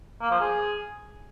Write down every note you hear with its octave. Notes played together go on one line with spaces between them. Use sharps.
A#3
F3
G#4